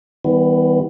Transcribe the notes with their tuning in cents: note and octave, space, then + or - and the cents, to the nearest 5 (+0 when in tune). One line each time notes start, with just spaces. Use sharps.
E3 -45 G3 +0 B3 +15